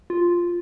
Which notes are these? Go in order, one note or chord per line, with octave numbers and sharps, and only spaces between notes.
F4